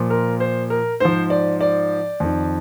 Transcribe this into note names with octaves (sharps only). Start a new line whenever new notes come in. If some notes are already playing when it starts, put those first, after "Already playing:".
Already playing: A#2 F3
A#4
C5
A#4
G#2 F3 C5
D5
D5
F2 D#3